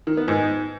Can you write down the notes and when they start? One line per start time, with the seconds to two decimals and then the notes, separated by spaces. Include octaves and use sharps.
0.07 D#3
0.17 B3
0.28 G#2